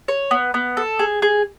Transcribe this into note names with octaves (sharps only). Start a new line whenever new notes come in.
C#5
B3
B3
A4
G#4
G#4